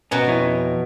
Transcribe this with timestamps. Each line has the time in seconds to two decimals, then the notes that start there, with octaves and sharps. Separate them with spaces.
0.11 B2 C#4 G#5 A#5
0.27 F2 E4 C#5